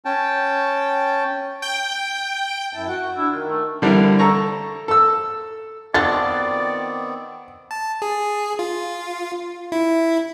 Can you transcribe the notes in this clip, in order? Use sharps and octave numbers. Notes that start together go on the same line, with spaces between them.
C#4 G5 A5
G5
F#2 E4 A5
F#4 F#5
D4 E4
D#3 F4
A3
D3 E3 G3 D4 E4 A#4
A4 A#5 C#6
A4 E6
D#3 B3 C4 F4 F#4 A4 D5 A6
A5
G#4
F4
E4